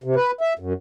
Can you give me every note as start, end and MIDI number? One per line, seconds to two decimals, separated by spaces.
0.04 0.15 48
0.16 0.31 71
0.41 0.53 76
0.59 0.73 42